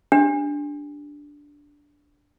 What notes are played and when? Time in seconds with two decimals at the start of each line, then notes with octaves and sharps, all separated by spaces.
0.12 D4 G4